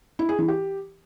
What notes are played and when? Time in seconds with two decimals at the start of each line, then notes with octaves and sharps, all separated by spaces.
0.19 E4
0.29 G#4
0.39 E3
0.48 G4